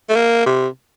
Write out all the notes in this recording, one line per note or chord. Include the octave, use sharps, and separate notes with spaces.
A3
A#3
C3